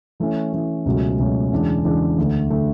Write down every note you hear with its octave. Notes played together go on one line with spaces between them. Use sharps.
E3 A3 C#4
E3 A3 C#4
C#2 B2 F#3 A3 C#4
C#2 B2 F#3 A3 C#4
E2 C#3 E3 G#3 D4
E2 C#3 E3 G#3 D4
D2 D3 A3
D3 A3